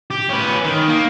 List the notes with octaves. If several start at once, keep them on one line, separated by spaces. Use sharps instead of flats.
G4
C#4 B4
D#3
A#3